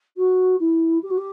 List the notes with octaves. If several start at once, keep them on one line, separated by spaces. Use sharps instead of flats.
F#4
E4
G4
F#4
G4